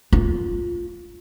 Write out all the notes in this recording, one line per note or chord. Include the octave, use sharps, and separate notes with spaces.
F4